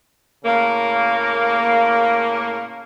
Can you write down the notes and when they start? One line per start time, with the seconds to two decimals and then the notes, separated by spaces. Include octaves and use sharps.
0.45 A2 C#3 A#3